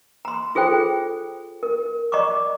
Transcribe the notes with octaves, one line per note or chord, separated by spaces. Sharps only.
A#5 C6
F4 G#4 A4 C5 G5
A#4
D5 D#5 A#5 C#6 D6